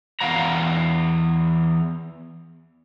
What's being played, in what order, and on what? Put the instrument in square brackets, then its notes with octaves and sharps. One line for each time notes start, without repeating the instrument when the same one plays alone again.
[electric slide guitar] E2 B3 F5 F#5 A#5